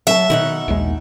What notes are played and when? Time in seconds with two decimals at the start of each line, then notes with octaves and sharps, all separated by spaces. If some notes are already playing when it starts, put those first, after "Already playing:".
0.07 F#3 E5 G#5 A5
0.30 B2 D#3 D#4 F#5
0.68 A#1 D#2 G#3